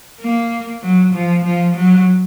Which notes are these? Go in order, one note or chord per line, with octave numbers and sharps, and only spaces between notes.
A#3
F#3
F3
F3
F#3